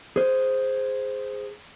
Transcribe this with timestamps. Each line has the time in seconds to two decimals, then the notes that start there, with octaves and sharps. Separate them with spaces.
0.16 G#4 C5